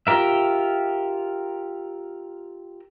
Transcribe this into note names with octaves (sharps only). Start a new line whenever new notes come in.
F4 G4 A#4 E5